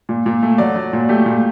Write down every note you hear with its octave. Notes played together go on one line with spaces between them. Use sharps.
A#2
A#2
A3
F#3 D5
F#3
A#2
A3 G4
A#2